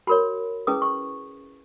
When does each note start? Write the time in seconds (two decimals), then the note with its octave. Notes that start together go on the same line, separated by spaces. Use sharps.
0.07 F#4 A#4 C#5 B5
0.67 C#4 E4 G#4 B4 D#6
0.82 C#6